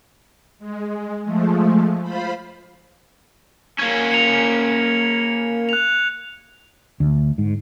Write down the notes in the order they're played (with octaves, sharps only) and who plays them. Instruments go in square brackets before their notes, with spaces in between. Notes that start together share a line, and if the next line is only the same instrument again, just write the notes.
[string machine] G#3
F3 G#3 A3
F4 C5 B5
[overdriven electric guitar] A#3 C#4 [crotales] G#6
[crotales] C#7 F7
F#6 F7
[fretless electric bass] D2
G#2